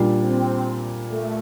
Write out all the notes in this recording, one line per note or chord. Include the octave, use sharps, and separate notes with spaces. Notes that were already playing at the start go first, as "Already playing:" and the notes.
Already playing: A#2 G3 D4
C4
A3